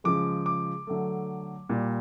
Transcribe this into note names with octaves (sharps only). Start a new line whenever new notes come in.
C#3 F3 G#3 D6
D6
D3 F#3 A3
A#2 G3